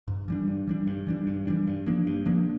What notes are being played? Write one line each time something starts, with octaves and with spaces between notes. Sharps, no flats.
G2
E3 G3 D4
G2
E3 G3 D4
G2
E3 G3 D4
G2
E3 G3 D4
G2
F3 A#3 D4
G2
F3 A#3 D4